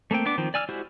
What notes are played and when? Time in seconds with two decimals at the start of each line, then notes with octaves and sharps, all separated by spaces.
0.11 A3 A#3 C4 G5
0.26 B3 D4 D6
0.38 D#3 F3 C4
0.54 D5 G#5 E6 F6
0.69 G#3 E4 F#4 G4 C5